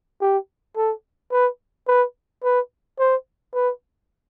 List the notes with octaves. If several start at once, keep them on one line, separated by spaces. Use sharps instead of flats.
G4
A4
B4
B4
B4
C5
B4